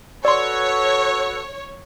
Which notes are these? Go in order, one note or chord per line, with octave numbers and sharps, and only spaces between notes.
F#4 A4 B4 C#5 D5 C6